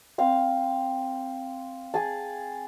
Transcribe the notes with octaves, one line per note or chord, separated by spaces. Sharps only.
C4 F5
G#4 A5